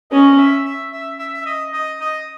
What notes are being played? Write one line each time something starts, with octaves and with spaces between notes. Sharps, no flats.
C#4 D#5
E5
E5
E5
E5
E5
D#5
D#5
D#5